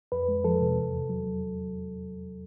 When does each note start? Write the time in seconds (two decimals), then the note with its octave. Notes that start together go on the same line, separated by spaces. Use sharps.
0.12 F2 B4
0.28 G#3
0.44 F3 A4
0.61 C3
0.78 E2
0.94 E2
1.09 F#3